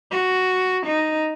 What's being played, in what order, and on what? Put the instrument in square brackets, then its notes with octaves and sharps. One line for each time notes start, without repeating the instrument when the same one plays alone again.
[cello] F#4
D#4